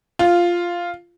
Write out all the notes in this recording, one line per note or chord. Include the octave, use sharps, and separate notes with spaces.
F4